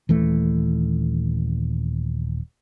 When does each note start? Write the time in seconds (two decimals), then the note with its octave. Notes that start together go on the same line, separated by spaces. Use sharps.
0.09 D#1 E3 A3